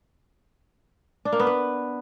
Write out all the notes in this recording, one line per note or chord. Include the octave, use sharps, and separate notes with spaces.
D4
A#3
B3
B4